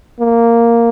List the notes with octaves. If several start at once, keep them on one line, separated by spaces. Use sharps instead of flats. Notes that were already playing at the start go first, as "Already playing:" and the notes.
A#3